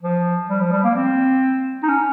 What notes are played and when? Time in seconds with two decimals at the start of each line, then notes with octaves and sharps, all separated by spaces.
0.03 F3
0.49 G3
0.61 F3
0.72 G3
0.84 A#3
0.96 C4
1.83 D#4
1.88 C#4